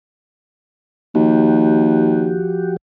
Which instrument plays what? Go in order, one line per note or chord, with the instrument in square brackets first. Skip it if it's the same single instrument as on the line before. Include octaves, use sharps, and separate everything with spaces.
[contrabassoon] D#2 [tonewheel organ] F3 F#4 G4